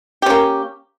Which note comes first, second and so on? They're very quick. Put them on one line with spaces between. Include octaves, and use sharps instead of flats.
G4 C#4 A#3